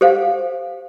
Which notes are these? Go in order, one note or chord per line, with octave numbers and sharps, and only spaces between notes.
G4 A4 C5 F5 F#5